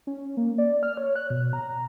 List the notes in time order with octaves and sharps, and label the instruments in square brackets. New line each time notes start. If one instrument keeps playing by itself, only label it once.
[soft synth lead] C#4
A#3
D5
F6
C#5
F#6
B2
A#5